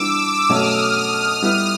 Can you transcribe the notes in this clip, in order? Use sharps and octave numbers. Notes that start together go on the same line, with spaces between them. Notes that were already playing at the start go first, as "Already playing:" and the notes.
Already playing: E3 G3 B3 D4 D6 E6
B2 F#3 A3 C#4 D#6 F6
G3 B3 E4